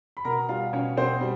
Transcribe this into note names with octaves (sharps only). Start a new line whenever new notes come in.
B5
B2 A#4 A#5
G3 F4 F5
B2 C#4 C#5
B2 C4 C5
G3